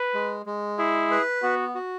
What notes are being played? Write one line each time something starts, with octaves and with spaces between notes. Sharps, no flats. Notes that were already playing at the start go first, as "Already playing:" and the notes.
Already playing: B4
G#3
G#3
E4 G#4
B4
B3 F#4
F#4